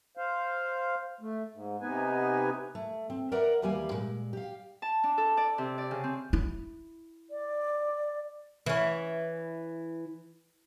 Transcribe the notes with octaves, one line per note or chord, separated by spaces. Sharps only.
C5 F5
A3
G#2
C3 B3 D#4 B4 G#5
A3
C4
A#4 B4 D5 E5 F#5 A#5
D#2 E3 G3 A#3 F5 G#5
A#2 G#3
G4 F5
A5
D4
A4
D5
C3
D5
C#3
C4
E4
D5
E3 C#4